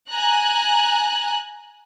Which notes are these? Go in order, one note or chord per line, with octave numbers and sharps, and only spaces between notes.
G#5 A#5 F#6